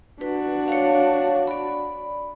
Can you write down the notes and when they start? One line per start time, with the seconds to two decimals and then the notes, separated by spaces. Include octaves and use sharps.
0.21 D4 F#4 B4
0.68 C#5 F5
1.47 D5 B5